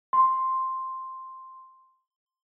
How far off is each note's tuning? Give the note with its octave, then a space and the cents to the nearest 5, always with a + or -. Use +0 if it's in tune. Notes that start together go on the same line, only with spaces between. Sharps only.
C6 +0